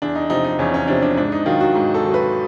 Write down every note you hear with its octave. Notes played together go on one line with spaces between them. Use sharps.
E2 D4
D#4
C3 F3 D#4
D#4
E2 C#4
C#4
C3 F3 D4
D4
G#2 D4
D#4
D#3 F#3 F4
F#4
G#2
A4
D#3 F#3
B4